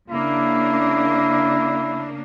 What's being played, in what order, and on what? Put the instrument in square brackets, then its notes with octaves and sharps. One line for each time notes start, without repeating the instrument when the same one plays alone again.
[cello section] C#3 A#3 D4 [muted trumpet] E4